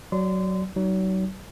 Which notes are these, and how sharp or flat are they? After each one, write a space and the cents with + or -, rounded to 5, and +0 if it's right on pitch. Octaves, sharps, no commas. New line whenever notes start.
F#3 +15 D5 +0 C6 -30
F#3 +35 D#4 +0